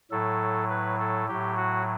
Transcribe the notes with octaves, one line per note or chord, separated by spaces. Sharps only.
A2 F#3 A4
B4
A4
A2 F#3 G4
F#4